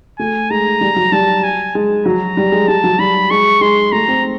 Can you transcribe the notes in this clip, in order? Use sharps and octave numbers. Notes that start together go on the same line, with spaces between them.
A3 G#5
G#3 A#5
G3
F#3
G3 A5
G#5
G#3
F#3 A#5
G3
G#3
G3 A5
F#3
G3 B5
G#3 C#6
G#3 C6
A3 A#5
C4